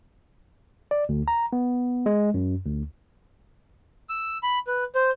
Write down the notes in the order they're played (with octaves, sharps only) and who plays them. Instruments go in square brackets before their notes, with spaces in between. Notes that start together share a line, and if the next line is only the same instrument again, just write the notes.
[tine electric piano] D5
D2
A#5
B3
G#3
F#2
D2
[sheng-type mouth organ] E6
B5
B4
C5